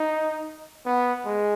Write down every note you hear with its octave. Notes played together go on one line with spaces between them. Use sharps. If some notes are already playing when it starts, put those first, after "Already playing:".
Already playing: D#4
B3
G#3